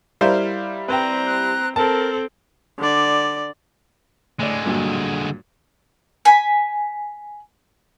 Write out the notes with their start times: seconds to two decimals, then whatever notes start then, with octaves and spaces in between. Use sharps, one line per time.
0.21 G3 E4 A#4 C5 F5
0.88 C4 B4 C5 G5 A#5
1.26 F#6
1.76 C4 A4 A#4 A5
2.79 D3 D5
4.39 A2 D3 G#3 D5
4.65 G2 A#2 F#3
6.25 G#5 B5